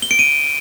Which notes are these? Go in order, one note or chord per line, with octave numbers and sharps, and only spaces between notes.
G7
D7
D#7